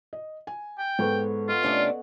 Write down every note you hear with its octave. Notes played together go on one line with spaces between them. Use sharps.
D#5
G#5
G5
G#2 B3 A4 C#5
F4 D#5 F#5
C3 A3 C#4 D4